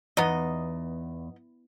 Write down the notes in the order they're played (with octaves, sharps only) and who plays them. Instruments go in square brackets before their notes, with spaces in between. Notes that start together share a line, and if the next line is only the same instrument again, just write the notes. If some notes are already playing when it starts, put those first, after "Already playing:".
[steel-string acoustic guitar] E2 [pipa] B3 D#4 D#5